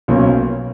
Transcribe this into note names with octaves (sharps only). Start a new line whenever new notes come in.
B1 B2 F#3 A#3 C#4